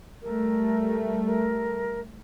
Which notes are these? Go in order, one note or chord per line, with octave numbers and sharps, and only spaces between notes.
G3 A3 A#4
A#4